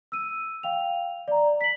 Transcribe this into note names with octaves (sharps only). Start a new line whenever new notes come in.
E6 D#7
F5 G5 F7
D5 A#5
B6 F#7